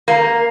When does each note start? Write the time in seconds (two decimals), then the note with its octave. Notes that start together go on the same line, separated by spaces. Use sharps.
0.08 A#3